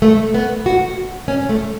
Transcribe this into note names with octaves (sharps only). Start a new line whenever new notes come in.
A3
B3
F#4
C#4
A3